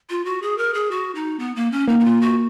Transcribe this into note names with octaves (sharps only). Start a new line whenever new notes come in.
F4
F#4
G#4
A#4
G#4
F#4
D#4
B3
A#3
C#4
A#3 D#4
D#4
F4
F#4